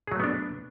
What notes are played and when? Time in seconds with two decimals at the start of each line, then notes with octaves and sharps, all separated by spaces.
0.07 G#4
0.12 F#3
0.16 A3
0.20 B3
0.24 D4